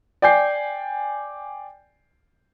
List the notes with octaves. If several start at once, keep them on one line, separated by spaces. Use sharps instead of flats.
D5 G5 G#5 G6 C7